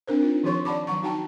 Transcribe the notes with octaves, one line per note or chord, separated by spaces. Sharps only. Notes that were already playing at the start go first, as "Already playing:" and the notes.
C4 D4 A#4 C5
D#4 F4
D#3 F3 G4 C#5 C6 C#6
D5 F#5 A5 B5 D6
D#3 F#3 F#5 A#5 C#6
D#4 F#4 F#5 G5 A5 A#5